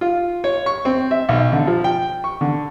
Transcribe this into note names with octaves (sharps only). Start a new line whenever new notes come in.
F4
C#5
C#6
C4
E5
B1
D3
F3
G5
C#6
D3